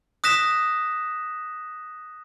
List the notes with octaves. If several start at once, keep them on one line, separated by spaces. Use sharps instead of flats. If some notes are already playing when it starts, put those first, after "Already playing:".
D#6 F#6 A#6 B6 E7